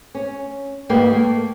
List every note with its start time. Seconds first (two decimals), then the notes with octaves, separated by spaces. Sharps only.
0.15 C#4
0.89 D2 G#2 A#3 G4 B4 G5
1.10 A3 A#3